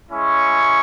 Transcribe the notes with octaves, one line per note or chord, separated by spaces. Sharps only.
G#3 C#4 E4 C#6